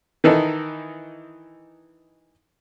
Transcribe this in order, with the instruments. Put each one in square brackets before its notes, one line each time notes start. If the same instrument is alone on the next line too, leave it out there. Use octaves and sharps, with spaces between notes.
[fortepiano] D#3 E3 D#4 A4